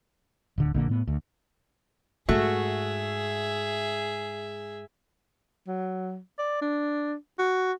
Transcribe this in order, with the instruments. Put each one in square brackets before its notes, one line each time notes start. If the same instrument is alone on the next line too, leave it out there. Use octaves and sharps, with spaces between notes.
[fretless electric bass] D1 D3
A#1 D3 A#3
A2 B3
D2
[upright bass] G#2 [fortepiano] A3 [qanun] F#4 [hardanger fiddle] G#4 E5
[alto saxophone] F#3
D5
D4
F#4